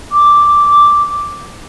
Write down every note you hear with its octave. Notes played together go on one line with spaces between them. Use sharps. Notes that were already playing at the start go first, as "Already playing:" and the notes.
D6